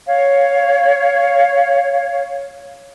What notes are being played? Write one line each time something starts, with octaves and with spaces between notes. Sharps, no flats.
C#5 F5